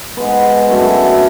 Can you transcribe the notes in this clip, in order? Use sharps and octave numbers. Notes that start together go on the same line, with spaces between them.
G#2 G#3 B3 B4
F#2 D3 A3 E4